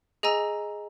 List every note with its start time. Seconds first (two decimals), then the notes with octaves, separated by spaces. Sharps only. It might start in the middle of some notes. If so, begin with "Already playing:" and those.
0.23 G#4 D#5 G#5 A#5 E6